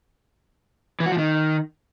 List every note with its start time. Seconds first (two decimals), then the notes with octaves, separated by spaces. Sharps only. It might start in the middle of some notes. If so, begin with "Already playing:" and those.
1.00 E3
1.06 F#4
1.12 F3
1.18 D#3